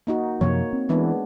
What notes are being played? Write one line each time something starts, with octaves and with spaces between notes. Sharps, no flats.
A#3 D#4 F#4
F#2 C3 F3 A#3 C#5
C4
E3 G#3 B3 D4